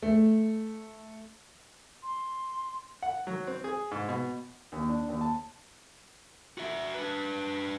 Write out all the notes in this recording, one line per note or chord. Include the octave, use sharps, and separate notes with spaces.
A3
C6
F#5
F#3
C4
G#4
G#2
B2
D#2
D4
D#2
A5
F#4 E5
D4 B4